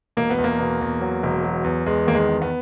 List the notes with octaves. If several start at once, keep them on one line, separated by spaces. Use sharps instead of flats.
E1 A#3
B3
E2
A#3
B2
E2
F#3
E1
F#3
E2
E2 G#3
D#3 A#3
G#3
E2
B3